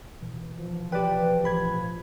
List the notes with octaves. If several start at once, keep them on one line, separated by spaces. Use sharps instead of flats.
B2 E3
F3
G4 B4 D5 G5
A1 B5 G#6